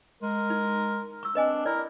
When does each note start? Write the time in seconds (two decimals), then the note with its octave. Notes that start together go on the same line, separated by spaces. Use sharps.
0.23 G#3 A#4
0.50 D#4
1.23 C#6 E6
1.35 C4 D4 B4 D#5 G#5
1.66 E4 A#4 D5